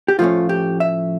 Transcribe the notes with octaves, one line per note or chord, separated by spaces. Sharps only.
G4
A2 F3 A3 C#4 F4
G4
E5